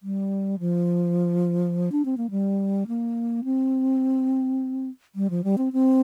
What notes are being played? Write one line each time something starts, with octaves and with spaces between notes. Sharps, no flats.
G3
F3
D4
C4
A#3
G3
A#3
C4
G3
F3
G3
C4
C4